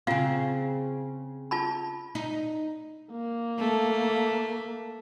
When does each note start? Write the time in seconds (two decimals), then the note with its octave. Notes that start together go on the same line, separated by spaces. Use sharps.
0.07 C#3 C4 F4 F5
1.51 F4 A5 B5
2.15 D#4
3.11 A#3
3.58 A3